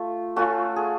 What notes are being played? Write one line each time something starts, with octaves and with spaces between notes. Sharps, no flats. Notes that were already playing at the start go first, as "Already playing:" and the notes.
Already playing: A3 F4
A3 C#4 F4 F#4
G#4